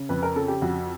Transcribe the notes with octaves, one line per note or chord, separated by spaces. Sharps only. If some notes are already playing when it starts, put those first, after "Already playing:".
Already playing: C#3
F2 B4
A#4
C#3 A4
G4
F2 F#4